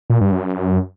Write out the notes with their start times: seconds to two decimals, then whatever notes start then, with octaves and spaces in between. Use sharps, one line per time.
0.10 A#2
0.21 G2
0.32 F#2